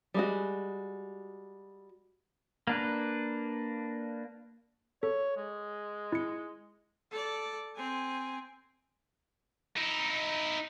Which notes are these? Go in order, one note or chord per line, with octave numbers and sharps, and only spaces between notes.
G3 G#3 F#4
A#3 D4 B4
A4 C#5
G#3
E4 C#7
A4 D5
C4 G#5
D#4 E4